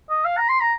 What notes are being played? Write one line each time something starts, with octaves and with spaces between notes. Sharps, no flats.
D#5
F5
A#5
C6
A#5